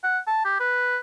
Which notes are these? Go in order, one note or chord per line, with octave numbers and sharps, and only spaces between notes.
F#5
A5
G4
B4